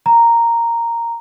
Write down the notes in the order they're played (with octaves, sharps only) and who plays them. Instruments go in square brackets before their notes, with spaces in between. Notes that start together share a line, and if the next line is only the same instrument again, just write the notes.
[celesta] A#5